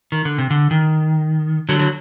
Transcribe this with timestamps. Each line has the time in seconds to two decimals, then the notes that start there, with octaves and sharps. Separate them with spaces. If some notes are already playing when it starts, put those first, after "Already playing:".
0.12 D#3
0.25 D3
0.38 C3
0.51 D3
0.71 D#3
1.69 D3 F#3
1.79 F#3